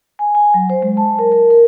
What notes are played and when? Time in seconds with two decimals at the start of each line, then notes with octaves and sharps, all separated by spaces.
0.19 G#5
0.35 G#5
0.54 F#3
0.70 C5
0.82 G#3
0.97 A5
1.19 A#4
1.32 A#4
1.50 A#4